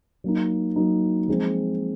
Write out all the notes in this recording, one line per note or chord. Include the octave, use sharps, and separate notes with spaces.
F#3 A#3 D#4
F#3 A#3 D#4
F3 G#3 C4